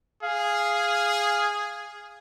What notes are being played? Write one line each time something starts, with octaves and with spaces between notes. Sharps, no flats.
G#4 F5